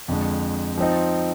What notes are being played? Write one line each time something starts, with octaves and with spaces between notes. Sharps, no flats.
F2 D3 G#3
F3 C4 D#4